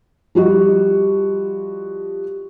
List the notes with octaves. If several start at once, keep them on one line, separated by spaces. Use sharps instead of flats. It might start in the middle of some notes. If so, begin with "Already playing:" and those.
F3 G3 F#4 D#5